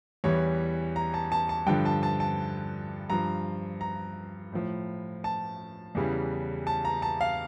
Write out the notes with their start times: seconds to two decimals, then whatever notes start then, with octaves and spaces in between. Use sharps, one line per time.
0.24 E2 E3 G3 C#5
0.96 A#5
1.14 A5
1.32 A5
1.49 A5
1.67 G2 D3 F3 G5
1.85 A5
2.03 A5
2.20 A5
3.10 G2 F3 A#5
3.81 A#5
4.52 A2 F3
5.24 A5
5.95 E2 C#3 E3 G3
6.67 A5
6.85 A#5
7.02 A5
7.21 F5